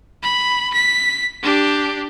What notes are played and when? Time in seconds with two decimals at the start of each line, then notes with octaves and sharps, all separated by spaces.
0.23 B5
0.73 B6
1.43 D4 G4